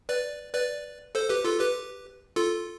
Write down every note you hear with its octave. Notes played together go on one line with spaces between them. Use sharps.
B4 D5
B4 D5
A4 C5
G4 B4
F4 A4
G4 B4
F4 A4